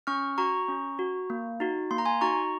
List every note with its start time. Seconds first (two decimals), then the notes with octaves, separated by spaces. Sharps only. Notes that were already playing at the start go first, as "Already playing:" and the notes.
0.07 C#4 C#6 F6
0.38 F#4 A#5 C#6
0.68 C#4
0.99 F#4
1.30 A#3
1.60 D#4 F#4
1.91 A#3 C6
1.98 A#5
2.06 G#5 C6
2.21 D#4 F#4 A#5 C#6